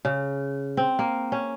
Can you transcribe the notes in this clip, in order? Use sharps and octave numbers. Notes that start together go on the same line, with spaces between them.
C#3
C4
A#3
C#4